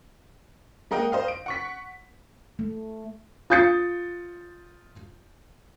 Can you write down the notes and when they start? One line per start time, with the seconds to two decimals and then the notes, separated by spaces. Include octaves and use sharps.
0.91 G#3 A#3 A#4 D#5 F#5 G5
1.12 C5 D#5 F5
1.28 D7
1.46 F#5 C#6 B6
2.59 A3
3.50 F4 D#6 G6 A6 C#7